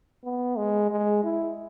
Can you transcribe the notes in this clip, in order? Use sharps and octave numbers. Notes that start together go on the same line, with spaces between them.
B3
G#3
G#3
E4